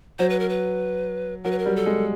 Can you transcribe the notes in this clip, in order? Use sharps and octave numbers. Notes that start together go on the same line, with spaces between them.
F#3 C5
B4
A#4
B4
F#3 A#4
B4
A#4
G3
A4
G#3